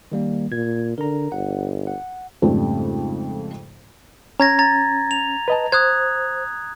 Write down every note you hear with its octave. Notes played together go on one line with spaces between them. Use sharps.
D#3 G3 A#3
A#2 G#6
D3 A#4 A#5
G1 F#5
F#5
F2 G#2 C#3 G3 A3 C4
C#4 A#5 G#6 A#6
A#5 A6
F7
B4 D#5 A5
C5 D#6 F#6 G#6